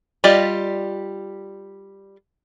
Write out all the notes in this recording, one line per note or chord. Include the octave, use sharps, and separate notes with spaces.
G3 F4 G4 D5 D#5